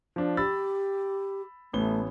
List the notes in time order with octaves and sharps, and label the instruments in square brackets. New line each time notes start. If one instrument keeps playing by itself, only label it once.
[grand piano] F3 D4 F4
[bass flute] G4 [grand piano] B5 E6 A6
[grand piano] A1 B3 G7 [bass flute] A3